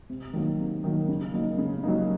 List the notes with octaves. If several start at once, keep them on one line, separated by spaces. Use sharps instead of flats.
C3
D#3 F#3 A#3
C3
D#3 F#3 A#3
C#3
F#3 A#3 D#4
C#3
F#3 A#3 D#4